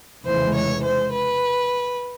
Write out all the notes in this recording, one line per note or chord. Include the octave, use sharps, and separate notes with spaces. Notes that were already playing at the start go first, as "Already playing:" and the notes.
F1 E2 C#3 E3 G#3 C5
C#5
C5
B4